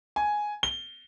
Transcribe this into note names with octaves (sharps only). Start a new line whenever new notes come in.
G#5
G7